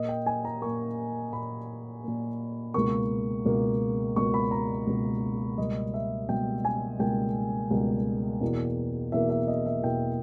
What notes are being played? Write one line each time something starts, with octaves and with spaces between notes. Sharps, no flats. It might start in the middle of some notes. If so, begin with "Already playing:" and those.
Already playing: A#2 A#3 D#5
G5
G#5
A#5
A#2 A#3 C#6
A#2 A#3 B5
A#2 A#3
C#2 B2 A#3 C#6
C#2 B2 A#3
C#2 B2 A#3 C#6
B5
A#5
C#2 B2 A#3
C#2 B2 G3 A#3 D#5
E5
C#2 B2 G3 A#3 G5
G#5
C#2 B2 G3 A#3 G5
C#2 B2 G3 A#3
E2 B2 A#3
E2 B2 A#3 E5
E5
D#5
E5
E2 B2 A#3 G5